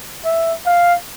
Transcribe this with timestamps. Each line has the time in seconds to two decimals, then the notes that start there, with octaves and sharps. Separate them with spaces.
0.25 E5
0.66 F5